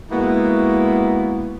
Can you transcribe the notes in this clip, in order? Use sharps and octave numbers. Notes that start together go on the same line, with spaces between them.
G#3 A#3 B3 E4 F#4